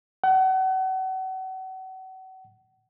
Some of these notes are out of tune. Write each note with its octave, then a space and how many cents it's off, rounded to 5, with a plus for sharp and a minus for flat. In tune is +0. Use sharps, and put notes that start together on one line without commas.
F#5 +35